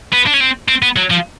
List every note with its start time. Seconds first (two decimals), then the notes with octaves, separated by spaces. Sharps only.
0.13 B3
0.27 D4
0.34 C#4
0.40 C4
0.68 C4
0.82 B3
0.97 F#3
1.11 F3